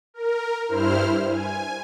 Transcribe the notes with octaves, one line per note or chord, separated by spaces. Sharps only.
A#4
G2 E4 C5 F6
G#5